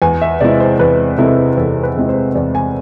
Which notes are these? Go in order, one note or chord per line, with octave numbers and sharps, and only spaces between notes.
E2 G#5
E5
C3 G#3 C4 E4 D5
C5
E2 B4
C3 G#3 C4 E4 A4
E2 A4
B4
C3 G#3 C4 E4
C5
E2 D5
G#5